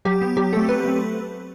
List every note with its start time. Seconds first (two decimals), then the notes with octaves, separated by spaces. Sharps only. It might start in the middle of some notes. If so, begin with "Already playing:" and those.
0.05 F#3 G4
0.22 B3
0.37 F#3 G4
0.53 A3 C4 A4
0.68 F#3 B4
0.84 A3 C4